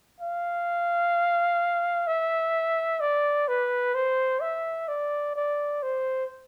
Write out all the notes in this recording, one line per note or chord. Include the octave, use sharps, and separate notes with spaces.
F5
E5
D5
B4
C5
E5
D5
D5
C5